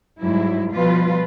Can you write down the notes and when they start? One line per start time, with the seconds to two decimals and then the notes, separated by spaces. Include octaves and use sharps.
0.20 G#2 F#3 G3 E4
0.74 B2 F3 G3 F4 B4